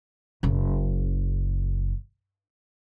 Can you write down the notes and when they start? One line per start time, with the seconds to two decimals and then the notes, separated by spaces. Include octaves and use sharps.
0.43 F#1 C#3